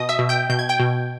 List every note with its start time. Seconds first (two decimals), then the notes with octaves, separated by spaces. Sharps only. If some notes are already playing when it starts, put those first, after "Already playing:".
Already playing: B2 D#5 D#6
0.09 E5 E6
0.19 B2
0.29 G5 G6
0.50 B2 G6
0.59 G#6
0.69 G5 G6
0.80 B2